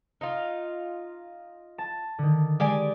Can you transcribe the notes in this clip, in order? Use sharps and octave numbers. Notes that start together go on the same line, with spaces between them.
D#4 F4
A5
D3 D#3
G#3 G4 D5 G#5